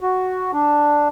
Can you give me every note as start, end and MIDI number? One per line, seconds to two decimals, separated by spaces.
0.01 0.51 66
0.53 1.08 62